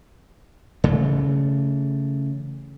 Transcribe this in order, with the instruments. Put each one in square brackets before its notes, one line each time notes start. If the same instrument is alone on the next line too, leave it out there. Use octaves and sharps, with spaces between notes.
[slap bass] C#3 E3 A3